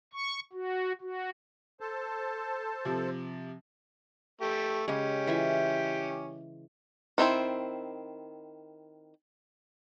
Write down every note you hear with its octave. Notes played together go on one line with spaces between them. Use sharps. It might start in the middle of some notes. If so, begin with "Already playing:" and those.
C#6
F#4
F#4
A4 C5 A5
C3 F3
A3 G4
C#3 G#3 C#4 G4
E3 F4 E5
D#3 C4 E4 C5